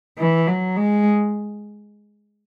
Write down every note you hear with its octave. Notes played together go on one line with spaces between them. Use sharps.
E3
F#3
G#3